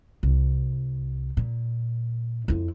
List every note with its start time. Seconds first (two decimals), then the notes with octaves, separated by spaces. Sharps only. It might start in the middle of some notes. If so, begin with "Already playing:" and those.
0.23 C2
1.37 A#2
2.48 F2 E4